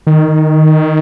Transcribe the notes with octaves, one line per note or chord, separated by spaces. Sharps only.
D#3